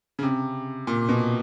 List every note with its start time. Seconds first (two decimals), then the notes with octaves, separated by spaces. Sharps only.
0.19 C#3
0.23 C3
0.87 A#2
1.09 B2